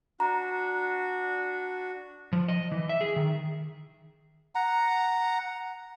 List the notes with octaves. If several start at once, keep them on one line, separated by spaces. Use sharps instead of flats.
D4 F#4 A#5
F3
D#5
E3
E5
G#4
D#3
F#5 A#5